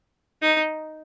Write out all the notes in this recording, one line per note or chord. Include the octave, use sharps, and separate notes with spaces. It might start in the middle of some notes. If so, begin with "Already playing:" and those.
D#4